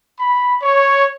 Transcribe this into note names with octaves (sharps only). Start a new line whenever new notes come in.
B5
C#5